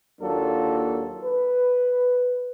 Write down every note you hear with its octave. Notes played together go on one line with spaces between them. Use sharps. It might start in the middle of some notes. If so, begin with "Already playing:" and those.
D#2 F#3 A#3 D4 F4 A4
B4